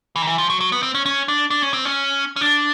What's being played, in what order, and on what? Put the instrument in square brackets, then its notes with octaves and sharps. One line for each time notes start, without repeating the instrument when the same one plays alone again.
[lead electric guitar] E3
D#3
E3
F3
F#3
F#3
B3
C4
C#4
C#4
D4
D4
C#4
C4
C#4
C#4
D4